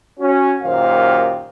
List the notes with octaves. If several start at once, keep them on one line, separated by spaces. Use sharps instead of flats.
C#4 F#4
F#2 A#2 D#3 G4 C5 F5